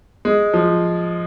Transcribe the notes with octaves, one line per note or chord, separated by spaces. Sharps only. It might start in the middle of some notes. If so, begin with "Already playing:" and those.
G#3
F3